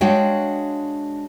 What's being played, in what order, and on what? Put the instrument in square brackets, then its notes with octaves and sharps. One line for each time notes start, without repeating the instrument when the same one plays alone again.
[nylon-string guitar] G#3 D4 F#4 C#5 F5 G5